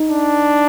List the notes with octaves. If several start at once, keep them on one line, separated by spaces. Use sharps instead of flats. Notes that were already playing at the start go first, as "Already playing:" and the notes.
Already playing: D#4
D4